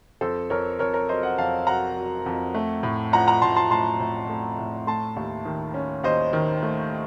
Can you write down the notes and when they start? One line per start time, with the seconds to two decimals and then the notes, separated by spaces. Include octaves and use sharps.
0.21 F2 A4 C5
0.50 F2 A#4 C#5
0.79 F2 A#4 C#5
0.94 A#4 C#5
1.09 F#3 C5 D#5
1.23 D#5 F#5
1.38 F2 F5 A5
1.67 F#3 F#5 A#5
1.96 F#3
2.26 F2
2.54 A3
2.83 A2
3.13 F3 F#5 A#5
3.27 F#5 A#5
3.42 A2 A5 C6
3.56 A5 C6
3.71 A2 A5 C6
4.00 A2
4.29 A3
4.58 A2
4.87 A3 A5 C6
5.16 D#2
5.45 D#3
5.74 C#4
6.04 D#2 C5 D#5
6.33 D#3
6.63 A3